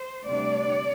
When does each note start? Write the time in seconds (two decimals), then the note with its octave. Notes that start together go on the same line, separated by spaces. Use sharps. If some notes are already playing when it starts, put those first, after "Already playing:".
Already playing: C5
0.25 D2 C3 G3 D4 D5